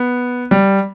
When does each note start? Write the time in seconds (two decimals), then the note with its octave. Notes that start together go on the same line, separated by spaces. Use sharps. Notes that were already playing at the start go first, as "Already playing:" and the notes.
Already playing: B3
0.51 G3